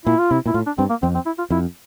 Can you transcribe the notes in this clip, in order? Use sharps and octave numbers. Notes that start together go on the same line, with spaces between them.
A#2 E4
F4
C3 E4
A#2 E4
A2 F4
D4
G2 C4
A#3
F2 C4
C4
E4
F4
F2 E4